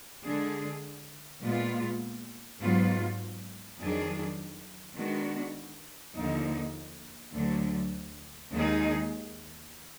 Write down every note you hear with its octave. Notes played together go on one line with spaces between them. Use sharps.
D3 G#3 D4 G#4
A#2 G#3 B3 F4
G#2 F#3 B3 F4
F2 D#3 F#3 D4 G#4
D#3 G#3 B3 D4 F#4
D#2 D3 F3 A#3 D#4
D2 D3 F#3
D#2 D#3 G#3 D#4 G#4